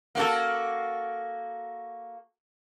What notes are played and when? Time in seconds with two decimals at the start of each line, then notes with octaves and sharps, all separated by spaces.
0.15 A#3 F#4 A4